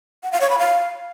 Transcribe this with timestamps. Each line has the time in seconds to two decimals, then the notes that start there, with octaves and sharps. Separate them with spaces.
0.23 F#5
0.32 F5
0.41 C#5
0.50 B5
0.58 F5